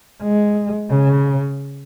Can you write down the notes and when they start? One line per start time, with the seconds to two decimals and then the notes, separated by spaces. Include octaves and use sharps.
0.23 G#3
0.90 C#3